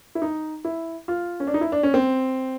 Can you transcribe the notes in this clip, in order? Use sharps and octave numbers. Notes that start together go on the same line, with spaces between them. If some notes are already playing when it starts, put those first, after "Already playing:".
E4
D#4
E4
F4
C#4
D4
D#4
E4
D4
C#4
C4